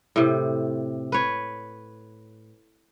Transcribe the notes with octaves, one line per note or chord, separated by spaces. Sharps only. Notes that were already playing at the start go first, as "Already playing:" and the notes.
A2 C3
B4 C#5